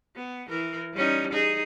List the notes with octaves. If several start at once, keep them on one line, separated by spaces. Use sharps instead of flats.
B3
E3 A#4
G3 C#4 D#4
D#4 G#4